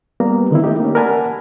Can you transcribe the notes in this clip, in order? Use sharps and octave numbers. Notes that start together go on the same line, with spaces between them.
G3 A#3 B3 A#5
D3 D#3 C4 E4
A3 D#4 G4
A#3 C#4
A#4 D5 F#5 G#5 A5 B5